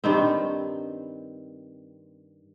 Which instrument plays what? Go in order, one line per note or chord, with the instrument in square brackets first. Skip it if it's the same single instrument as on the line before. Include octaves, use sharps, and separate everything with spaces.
[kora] G2 D#3 C4